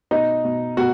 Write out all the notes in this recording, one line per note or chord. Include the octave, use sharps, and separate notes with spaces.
B2 D#4 D#5
B2
B2 F#4 F#5